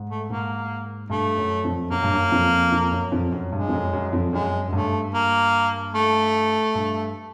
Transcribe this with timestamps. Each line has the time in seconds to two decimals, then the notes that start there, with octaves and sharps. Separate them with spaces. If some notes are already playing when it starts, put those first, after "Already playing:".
Already playing: G#2
0.10 A3
0.29 G#2 A#3
1.10 G2 A3
1.37 F#2
1.64 F2
1.91 F#2 A#3
2.03 G2
2.14 F#2
2.32 F2
2.72 F2
2.92 F#2
3.12 F2
3.32 F#2
3.52 G2 G#3
3.68 F2
3.73 F#2
3.93 F#2
4.13 F2
4.33 F#2 G#3
4.68 F#2
4.73 G2 A3
5.14 A#3
5.94 A3
6.75 G2